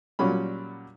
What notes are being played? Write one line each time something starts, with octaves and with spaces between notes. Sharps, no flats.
A#2 F#3 G3 C#4 B5